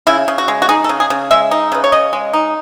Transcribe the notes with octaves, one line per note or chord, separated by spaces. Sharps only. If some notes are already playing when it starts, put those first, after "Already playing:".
C#3 E4
C#3
F#4
G#3
F#4
D#4 G#4
A4
C#3
G#4
C#3
G#3 E5
D#4
C#3 B4
C#5
C#3 D#5
G#3
D#4